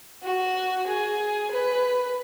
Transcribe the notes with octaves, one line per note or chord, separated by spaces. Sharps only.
F#4
G#4
B4